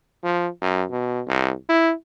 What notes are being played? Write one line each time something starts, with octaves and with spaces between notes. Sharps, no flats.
F3
F#2
B2
C2
E4